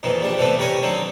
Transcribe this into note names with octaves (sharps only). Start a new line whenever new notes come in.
F2 A#2 D#3 E3
A#1 G3 D4
C3 E3 G3 A3 B3
C2 G3 A#4 C#5 G#5
D3 D#3 F#3 C4